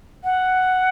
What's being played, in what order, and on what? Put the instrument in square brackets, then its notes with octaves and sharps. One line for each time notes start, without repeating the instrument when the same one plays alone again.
[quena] F#5